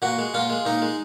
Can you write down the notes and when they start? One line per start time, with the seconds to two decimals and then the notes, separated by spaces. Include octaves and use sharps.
0.02 A#2 F#4
0.19 G#3
0.34 A#2 F4
0.50 G#3
0.66 A#2 D#4
0.82 G#3